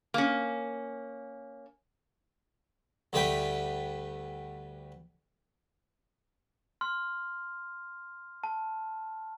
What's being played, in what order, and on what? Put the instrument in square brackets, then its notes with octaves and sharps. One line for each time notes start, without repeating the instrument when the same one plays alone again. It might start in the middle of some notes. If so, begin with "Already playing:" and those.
[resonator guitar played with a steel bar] A#3 C#4
[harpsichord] D2 D3 G3 A3 B4 G5
[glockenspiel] C6 F6
A5